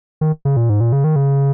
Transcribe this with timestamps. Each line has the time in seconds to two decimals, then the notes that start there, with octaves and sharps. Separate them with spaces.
0.21 D#3
0.45 C#3
0.57 A#2
0.70 G#2
0.81 A#2
0.92 C#3
1.04 D#3
1.16 C#3